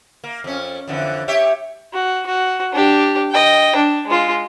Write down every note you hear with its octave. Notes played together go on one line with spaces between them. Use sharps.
A#3
F2 C#4
F2 D3 E3
G4 C#5 E5
F#4
F#4
D4 G4
D#5 G5
D4
G#3 F4